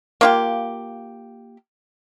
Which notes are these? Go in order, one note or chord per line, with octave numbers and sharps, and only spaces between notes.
A#3 F4 G4